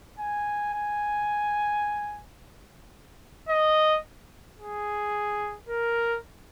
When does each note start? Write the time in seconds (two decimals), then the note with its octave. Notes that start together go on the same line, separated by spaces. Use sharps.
0.19 G#5
0.74 G#5
3.49 D#5
4.59 G#4
5.69 A#4